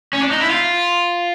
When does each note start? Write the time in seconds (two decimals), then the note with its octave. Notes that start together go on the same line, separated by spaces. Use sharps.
0.13 C#4
0.22 D4
0.31 D#4
0.41 E4
0.50 F4